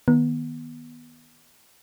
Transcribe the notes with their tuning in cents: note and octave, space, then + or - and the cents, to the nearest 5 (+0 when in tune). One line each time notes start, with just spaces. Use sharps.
D#3 +0 B3 -25